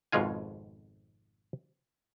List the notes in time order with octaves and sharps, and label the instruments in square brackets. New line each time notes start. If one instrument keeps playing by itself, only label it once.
[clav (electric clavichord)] G#1 F2 B2 G#3 F4 G#5